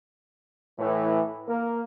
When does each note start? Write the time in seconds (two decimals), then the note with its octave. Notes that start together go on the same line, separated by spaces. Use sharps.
0.79 A2 E3
1.48 A#3 A#4